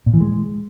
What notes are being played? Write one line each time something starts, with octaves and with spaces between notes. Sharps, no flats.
A#2
E3
G#3